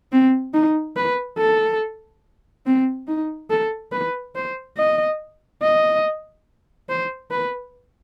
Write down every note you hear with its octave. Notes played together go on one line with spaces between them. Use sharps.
C4
D#4
B4
A4
C4
D#4
A4
B4
C5
D#5
D#5
C5
B4